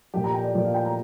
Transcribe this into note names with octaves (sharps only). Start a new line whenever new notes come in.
A#2 F3 G4
A#5
G5
D5
A#2 F3 D5
F5
G5
A#5